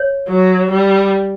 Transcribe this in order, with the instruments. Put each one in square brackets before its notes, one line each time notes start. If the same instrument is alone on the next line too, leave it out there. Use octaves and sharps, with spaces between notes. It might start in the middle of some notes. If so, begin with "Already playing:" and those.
Already playing: [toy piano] C#5
[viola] F#3
G3